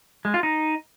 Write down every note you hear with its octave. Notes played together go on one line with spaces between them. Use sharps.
G#3
F4
D#4